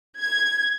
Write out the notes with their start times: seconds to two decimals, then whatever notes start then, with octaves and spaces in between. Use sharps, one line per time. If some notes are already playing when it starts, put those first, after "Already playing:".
0.20 G#6